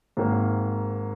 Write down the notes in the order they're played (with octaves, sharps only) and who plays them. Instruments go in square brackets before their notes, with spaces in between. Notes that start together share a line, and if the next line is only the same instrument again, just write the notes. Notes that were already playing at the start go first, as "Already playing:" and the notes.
[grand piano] G#1 G#2 D#3 A#3